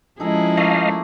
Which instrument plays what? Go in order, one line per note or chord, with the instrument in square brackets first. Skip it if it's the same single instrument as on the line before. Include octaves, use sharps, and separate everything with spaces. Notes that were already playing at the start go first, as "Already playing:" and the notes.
[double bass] F3 G#3 [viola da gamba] C#4 E4 G#4 [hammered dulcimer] D#4 A4 A#5
[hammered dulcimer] A3 A#3 [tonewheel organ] D#5 F5